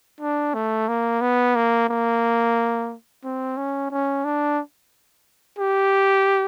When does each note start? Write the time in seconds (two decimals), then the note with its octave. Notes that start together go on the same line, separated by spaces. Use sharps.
0.21 D4
0.54 A3
0.88 A#3
1.21 B3
1.56 A#3
1.89 A#3
3.24 C4
3.57 C#4
3.91 C#4
4.25 D4
5.59 G4